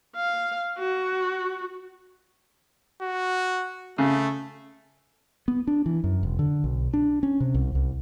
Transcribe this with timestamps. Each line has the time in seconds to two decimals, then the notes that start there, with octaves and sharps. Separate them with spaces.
0.16 F5
0.78 F#4
3.02 F#4
3.98 C#3 A3
5.48 B3
5.67 D4
5.86 E3
6.04 F#2
6.23 E1
6.39 D3
6.64 B1
6.94 D4
7.23 C#4
7.40 C3
7.54 C2
7.75 C2